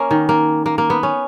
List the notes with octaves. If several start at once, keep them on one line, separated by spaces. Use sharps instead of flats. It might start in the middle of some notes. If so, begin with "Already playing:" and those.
Already playing: A#3 C#4
D#3
A#3
A#3
A#3
B3
C#4